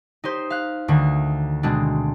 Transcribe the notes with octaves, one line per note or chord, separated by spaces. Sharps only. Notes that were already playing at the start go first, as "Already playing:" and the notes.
D#4 G4 C5
F5 F#6
D2 D3 D#3
B2 G#3 C4 D4